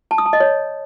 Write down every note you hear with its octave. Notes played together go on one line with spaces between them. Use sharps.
A5
D#6
A5
D#5
C#5